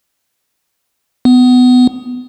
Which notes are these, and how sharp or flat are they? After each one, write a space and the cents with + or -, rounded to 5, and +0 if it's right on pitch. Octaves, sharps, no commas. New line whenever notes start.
B3 +20